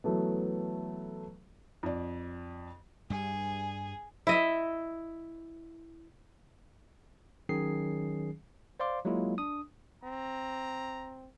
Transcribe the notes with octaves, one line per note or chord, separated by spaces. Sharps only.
E3 F#3 A3 B3
F2 D5
G2 G3 G#4
E4 D#5 E5
D#3 F#3 C#4 G#4 C7
C5 D5 F5 C6 D6
F#3 G#3 A#3 E4 F4
D4 D#6
C4 A#5